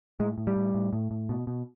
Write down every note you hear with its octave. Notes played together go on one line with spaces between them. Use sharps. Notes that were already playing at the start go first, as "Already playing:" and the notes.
A2 G#3
A2
G3
A2
A2
A2
A2
B2
B2